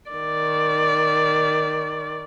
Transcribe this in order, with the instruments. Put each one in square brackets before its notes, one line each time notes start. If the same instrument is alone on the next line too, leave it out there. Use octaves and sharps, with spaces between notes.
[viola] D#3 D5